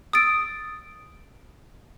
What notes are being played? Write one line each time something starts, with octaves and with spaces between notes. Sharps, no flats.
D#6 E6 A6 D7